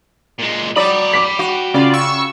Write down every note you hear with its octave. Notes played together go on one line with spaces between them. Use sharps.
A#2 G#3
F#3 D5 G5 B5
D6 B6 F#7
F#4
C#3 F4 D5
C#6 E6